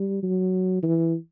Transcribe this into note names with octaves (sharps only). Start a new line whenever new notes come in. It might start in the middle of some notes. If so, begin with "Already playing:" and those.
Already playing: G3
F#3
E3